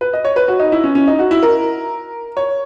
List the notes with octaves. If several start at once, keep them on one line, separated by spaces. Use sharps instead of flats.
B4
D#5
C#5
B4
F#4
D#4
E4
C#4
C#4
D#4
F#4
E4
A#4
C#5